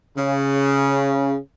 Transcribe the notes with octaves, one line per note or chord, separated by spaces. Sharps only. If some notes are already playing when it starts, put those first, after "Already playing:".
C#3